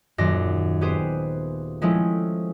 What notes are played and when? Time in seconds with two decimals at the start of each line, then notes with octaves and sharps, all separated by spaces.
0.18 D#1 F#2 D#3 D5 C6 A#6
0.81 B3 G4 G#4 B4 C5
1.82 F3 G#3 A3 C4 C#4 E4